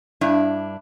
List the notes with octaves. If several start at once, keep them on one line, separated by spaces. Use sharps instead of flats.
G2 D4 E4